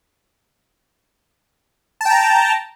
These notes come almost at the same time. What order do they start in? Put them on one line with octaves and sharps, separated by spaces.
A5 G5 A#5